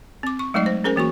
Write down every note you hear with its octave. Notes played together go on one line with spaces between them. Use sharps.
C4 D6
C#6
F#3 G#3 A3 D#4 D5 D#5
C5
C#4 G#4 A#4 C5 G#5
E3 A#3 F#4 C#6